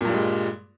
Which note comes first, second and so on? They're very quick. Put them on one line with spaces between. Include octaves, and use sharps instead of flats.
A#2 G2 G3 G#3